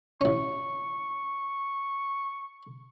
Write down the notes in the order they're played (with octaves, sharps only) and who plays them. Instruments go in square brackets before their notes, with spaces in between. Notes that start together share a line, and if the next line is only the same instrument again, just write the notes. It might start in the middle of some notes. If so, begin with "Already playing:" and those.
[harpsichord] A1 C#4 [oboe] C#6